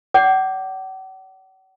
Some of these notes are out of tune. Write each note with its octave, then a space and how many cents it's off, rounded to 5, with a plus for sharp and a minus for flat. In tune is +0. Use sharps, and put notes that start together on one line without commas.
D5 -40 F#5 +45 D6 +0